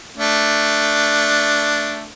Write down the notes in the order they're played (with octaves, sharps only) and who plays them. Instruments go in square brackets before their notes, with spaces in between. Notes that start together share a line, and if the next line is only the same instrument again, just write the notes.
[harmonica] A3 D4